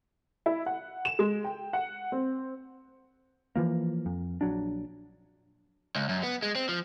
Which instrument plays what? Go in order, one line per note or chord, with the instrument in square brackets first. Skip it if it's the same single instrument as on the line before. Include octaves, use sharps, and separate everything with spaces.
[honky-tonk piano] E4
F#5
E7
G#3
G5
F#5
C4
[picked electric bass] E3 F3 A#3
F2
A#1 F#3 D4
[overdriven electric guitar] C#2
F#2
B3
G#3
C4
F3